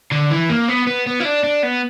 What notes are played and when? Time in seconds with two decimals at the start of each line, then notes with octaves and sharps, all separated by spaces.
0.12 D3
0.30 E3
0.49 A#3
0.68 B3
0.87 B3
1.06 B3
1.20 E4
1.25 D4
1.44 D4
1.63 B3